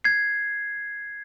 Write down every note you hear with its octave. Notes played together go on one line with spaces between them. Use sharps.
G#6 C7